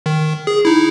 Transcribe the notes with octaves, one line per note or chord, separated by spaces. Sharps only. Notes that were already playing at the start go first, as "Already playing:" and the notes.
D#3
G#4
D#4 E4